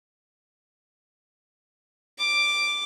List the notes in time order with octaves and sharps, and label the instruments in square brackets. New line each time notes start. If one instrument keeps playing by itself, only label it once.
[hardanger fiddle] D6